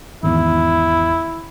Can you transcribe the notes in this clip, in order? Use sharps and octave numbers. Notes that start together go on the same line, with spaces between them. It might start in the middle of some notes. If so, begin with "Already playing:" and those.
G#1 E2 E4